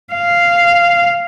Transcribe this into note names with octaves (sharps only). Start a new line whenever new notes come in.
F5